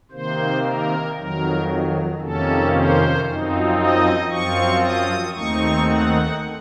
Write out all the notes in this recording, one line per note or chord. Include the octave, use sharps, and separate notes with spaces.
C3 D#3 A#3 C5
A#4
F2 D#3 F#3 A#4
F2 C3 D#3 A#3 C#4 A4
C5
F#2 F3 C4 D#4
D#5
F#2 F3 C4 F4 C#6
D#6
D#2 D#3 A3 C4 D#4 C#6
F#5